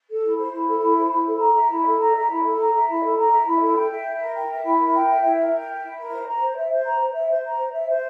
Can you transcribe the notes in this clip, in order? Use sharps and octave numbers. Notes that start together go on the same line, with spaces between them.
A4
E4
C5
E4
A4
E4
C5
E4
A4
A#5
E5
E4
A4
A#5
E5
E4
A4
A#5
E5
E4
A4
A#5
E5
E4
A4
G5
E5
E4
A#4
G5
E5
E4
A#4
G5
E5
E4
A#4
G5
E5
E4
A#4
C5
A#5
C5
E5
C5
A#5
C5
E5
C5
A#5
C5
E5
C5